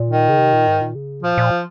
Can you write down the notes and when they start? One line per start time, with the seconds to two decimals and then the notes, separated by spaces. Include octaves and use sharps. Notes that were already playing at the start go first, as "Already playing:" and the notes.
Already playing: A#2
0.10 D#3
0.29 C#3
0.38 C3
0.53 A#2
0.67 G#2
0.81 A#2
0.95 C#3
1.23 A#2 F3
1.38 A#2